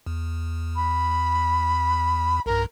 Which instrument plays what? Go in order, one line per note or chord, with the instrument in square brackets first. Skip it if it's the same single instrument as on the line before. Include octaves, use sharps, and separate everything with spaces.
[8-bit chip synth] E2
[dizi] B5
[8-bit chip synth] B1 G2 [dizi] A#4